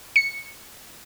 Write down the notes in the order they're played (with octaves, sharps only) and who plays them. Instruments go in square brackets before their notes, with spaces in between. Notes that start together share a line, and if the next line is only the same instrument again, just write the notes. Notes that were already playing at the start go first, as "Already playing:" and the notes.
[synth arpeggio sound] C#7